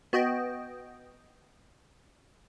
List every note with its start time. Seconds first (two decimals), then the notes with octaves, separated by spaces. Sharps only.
0.13 B3 F#4 D#5 G5